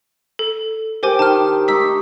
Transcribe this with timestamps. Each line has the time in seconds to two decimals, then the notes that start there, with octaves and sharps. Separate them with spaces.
0.39 A4
1.03 G4 A#4 C5 G#5
1.19 D#3 A5 F6
1.68 A3 D#4 E6 B6